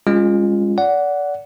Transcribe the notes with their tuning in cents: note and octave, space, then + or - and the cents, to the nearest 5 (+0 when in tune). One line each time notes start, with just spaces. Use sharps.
G#3 -25 C#4 -5 F4 +0
D5 -25 F#5 +0